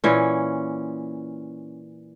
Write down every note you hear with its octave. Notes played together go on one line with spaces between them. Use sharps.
A#2 E3 C#4